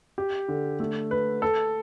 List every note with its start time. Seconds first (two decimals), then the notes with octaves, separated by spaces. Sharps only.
0.18 G4
0.48 D3
0.80 A3
1.11 B4
1.42 A4